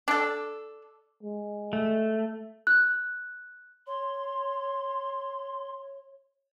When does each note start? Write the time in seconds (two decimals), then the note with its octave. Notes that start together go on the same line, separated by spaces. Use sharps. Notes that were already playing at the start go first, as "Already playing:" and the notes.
0.08 D4 A4
1.23 G#3
1.73 A3
2.67 F#6
3.87 C#5 C6